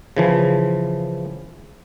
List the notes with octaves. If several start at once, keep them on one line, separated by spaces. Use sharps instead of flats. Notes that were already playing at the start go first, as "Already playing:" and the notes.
C#3 E3 F3